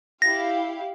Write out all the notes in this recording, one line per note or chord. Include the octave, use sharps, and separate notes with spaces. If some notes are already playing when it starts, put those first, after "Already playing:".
E4 G4 F5 A#6